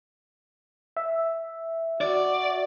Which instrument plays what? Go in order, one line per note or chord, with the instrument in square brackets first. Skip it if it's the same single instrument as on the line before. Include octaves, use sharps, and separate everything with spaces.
[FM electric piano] E5
[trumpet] F#4 [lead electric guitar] D5